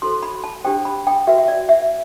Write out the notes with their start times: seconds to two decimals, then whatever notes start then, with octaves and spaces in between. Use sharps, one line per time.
0.02 F#4 A4 C5 C6
0.23 B5
0.44 A5
0.64 D4 G4 C5 G5
0.85 B5
1.07 G5
1.27 F#4 B4 E5
1.38 E5
1.48 D5
1.69 E5